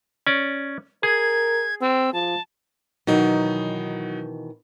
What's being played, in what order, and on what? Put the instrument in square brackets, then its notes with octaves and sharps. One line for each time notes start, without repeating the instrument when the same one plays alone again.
[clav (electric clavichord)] C#4 D5
[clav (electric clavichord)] G#4 [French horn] A#4 [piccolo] G#6
[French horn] C4 [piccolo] E6
[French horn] F3 [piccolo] A5
[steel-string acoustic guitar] B2 D#3 E3 [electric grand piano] F#3 D#4